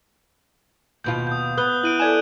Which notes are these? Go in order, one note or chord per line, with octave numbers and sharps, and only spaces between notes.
D#2 B2 F4 G6
D#6 G6
B3 D#6 F#6 G7
E4 D7 D#7 F#7
A4 D5 G#5 G6 G#6 E7